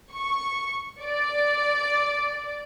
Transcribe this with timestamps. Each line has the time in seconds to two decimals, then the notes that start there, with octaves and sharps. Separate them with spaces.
0.12 C#6
1.03 D5